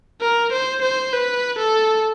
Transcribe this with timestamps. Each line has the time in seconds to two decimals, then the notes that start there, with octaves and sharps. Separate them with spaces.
0.21 A#4
0.52 C5
0.82 C5
1.13 B4
1.59 A4